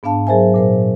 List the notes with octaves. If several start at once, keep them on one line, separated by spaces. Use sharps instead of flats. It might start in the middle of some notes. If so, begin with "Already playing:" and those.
G#2 B3 D4 F5 A5
F#3 G#4 A#4 C5 E5 G#5
A#2 A#4 C5